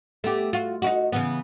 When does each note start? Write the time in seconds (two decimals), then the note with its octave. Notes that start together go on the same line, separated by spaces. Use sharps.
0.24 A3 B3 G4
0.53 F4 F#4
0.82 D#4 E4 F#4
1.12 C#3 E3 B3